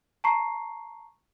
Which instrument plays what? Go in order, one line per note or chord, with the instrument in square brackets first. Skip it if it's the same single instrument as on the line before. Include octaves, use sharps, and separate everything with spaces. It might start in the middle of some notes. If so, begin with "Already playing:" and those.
[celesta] A5 A#5 C#6 C7